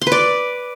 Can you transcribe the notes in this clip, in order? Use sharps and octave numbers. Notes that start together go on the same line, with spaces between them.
C6
B4
D5